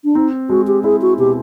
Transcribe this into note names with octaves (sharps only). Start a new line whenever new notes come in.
D4
C4 D#4
G#3 F#4
G4
E4 G#4
F#4
B2 G4